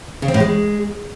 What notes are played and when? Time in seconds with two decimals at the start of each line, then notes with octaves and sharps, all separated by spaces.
0.22 C#3
0.28 C4
0.34 A2
0.40 G#3